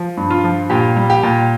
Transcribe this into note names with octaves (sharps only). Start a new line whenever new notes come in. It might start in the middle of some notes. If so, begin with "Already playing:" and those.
Already playing: F3
G2
F4
F3
A#2 G4
G3
G4
A#2